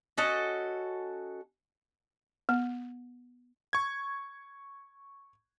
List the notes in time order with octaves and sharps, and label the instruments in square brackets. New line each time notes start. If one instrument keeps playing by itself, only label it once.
[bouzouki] C#4 F#4 A4 D#5
[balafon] B3
[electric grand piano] C#6 G#6